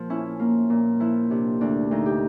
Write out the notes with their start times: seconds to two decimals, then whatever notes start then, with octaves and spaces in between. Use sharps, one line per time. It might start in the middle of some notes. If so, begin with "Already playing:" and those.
Already playing: A#2 F3
0.10 C#4 E4
0.39 A#3 F4
0.70 A#2
1.00 F3 E4
1.30 C3 D4
1.61 D2 D4
1.91 D2 D#4
2.06 G4